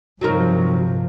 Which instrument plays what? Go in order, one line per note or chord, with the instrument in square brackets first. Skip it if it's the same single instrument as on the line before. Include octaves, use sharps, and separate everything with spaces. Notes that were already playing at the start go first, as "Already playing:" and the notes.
[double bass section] G2 C3 F3 [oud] F#3 D#4 A#4